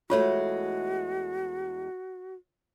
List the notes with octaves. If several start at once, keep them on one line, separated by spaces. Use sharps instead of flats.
E2 G#3 A3 F4 F#4 C#5